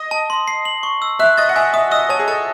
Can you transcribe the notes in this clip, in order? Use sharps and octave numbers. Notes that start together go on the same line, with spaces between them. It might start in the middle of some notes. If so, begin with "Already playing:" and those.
Already playing: D#5
A5
C6
C7
F#7
C#6
E6
E5 F#6
D#5 A6
F#5
E5 G#5
E5 D#6
D#5 E6
C#5 A5
G#4
A4 A5